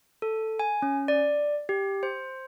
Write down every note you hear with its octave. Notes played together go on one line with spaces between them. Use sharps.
A4
G#5
C#4
D5
G4
C5